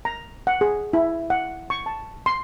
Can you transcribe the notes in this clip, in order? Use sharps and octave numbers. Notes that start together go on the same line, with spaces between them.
A#5
F#5
G#4
E4
F#5
C#6
A5
C6